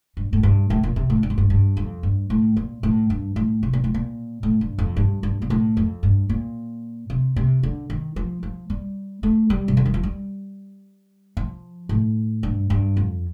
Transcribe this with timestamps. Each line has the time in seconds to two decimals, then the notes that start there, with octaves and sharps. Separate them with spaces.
0.17 G2
0.33 A2
0.43 G2
0.70 A2
0.83 A#2
0.96 C3
1.10 A2
1.23 G2
1.30 A2
1.38 G2
1.50 G2
1.77 F2
2.03 G2
2.30 A2
2.57 A#2
2.83 A2
3.10 G2
3.36 A2
3.63 C3
3.73 A#2
3.84 A2
3.94 A#2
4.43 A2
4.61 G2
4.78 F2
4.97 G2
5.23 G2
5.42 A#2
5.50 A2
5.77 F2
6.03 G2
6.29 A#2
7.10 C3
7.36 C3
7.63 D3
7.90 D#3
8.16 F3
8.43 F3
8.70 G3
9.23 A3
9.50 G3
9.68 C3
9.77 D3
9.85 D#3
9.94 F3
10.03 G3
11.37 F3
11.89 A2
12.43 G2
12.70 G2
12.97 F2